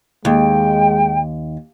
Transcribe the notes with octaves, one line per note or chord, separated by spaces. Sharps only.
D#2 G#3 G5